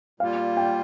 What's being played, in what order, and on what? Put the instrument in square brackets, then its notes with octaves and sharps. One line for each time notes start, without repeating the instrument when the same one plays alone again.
[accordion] A#2 G3 A#3 F4 [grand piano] F5
[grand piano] G5